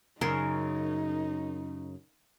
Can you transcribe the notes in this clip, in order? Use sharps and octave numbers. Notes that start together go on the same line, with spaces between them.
F#2 C#3 D#4 A#4 C6